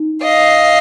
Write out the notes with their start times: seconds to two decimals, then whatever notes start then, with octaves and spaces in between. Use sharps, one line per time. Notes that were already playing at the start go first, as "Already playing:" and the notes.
Already playing: D#4
0.22 D#5 F5